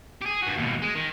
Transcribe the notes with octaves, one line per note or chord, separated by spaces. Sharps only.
G4 G#4
G2 F#4
D#2 B2
G#3
D#3